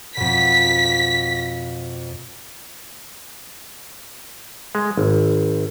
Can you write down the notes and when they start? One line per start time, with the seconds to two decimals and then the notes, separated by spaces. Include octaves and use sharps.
0.17 F2 B2 B6
4.75 G#3
4.97 G#1